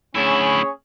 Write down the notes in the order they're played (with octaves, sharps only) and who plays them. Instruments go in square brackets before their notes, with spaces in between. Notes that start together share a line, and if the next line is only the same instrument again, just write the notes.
[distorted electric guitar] D2 E4 [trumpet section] C#4 G#4 C#5